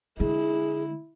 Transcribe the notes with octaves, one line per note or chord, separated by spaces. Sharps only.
D3 G#3 E4 G#4